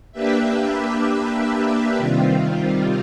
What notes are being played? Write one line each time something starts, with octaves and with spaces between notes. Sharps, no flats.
A#3 D4 G4 B4 E5
C3 D#3 G3 C4 F4